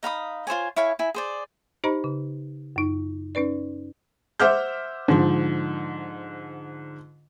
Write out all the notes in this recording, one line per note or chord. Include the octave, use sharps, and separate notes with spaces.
D#4 F5 B5 D#6
F4 C5 C#5 G#5
E4 C#5 F5 G#5
E4 G#5
G#4 C5 D5
D#4 G4 C5 D#5 A#5 B5
C#3
F#2 D#4
C#4 D#4 B4 D5
C5 E5 F#5 D6 F6 G6
G#2 D3 F3